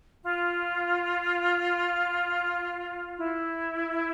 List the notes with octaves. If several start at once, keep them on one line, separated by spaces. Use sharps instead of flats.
F4
E4